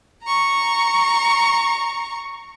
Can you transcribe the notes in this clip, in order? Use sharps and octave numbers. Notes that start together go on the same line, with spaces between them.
A#5 C#6